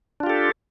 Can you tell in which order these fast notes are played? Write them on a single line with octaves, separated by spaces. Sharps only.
D4 F4 G4 A4